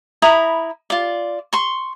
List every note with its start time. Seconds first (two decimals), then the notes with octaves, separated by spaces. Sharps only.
0.22 E4 A#5 B5 D#6
0.90 F4 D5
1.53 C6 C#6